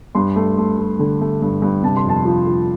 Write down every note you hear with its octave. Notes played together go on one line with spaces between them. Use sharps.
G2 C6
A3
A3
A3
D3
A3
G2
G2
C3 A5
C6
F2 A5
F3
F3